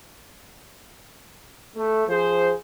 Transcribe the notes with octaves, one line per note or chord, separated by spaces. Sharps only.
A3
F3 G#4 C5